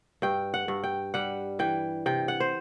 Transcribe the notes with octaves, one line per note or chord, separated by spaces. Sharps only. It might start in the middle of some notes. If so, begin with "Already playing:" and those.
G2 G5
F#5
G2
G5
G3 F#5
E3 G5
C3 G5
F#5
C5